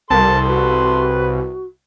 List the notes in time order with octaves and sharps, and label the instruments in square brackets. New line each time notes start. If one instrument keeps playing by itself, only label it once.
[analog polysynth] C2 [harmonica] A4 C6 [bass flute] A#4 [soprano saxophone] A5
[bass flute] F#4 [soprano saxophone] B4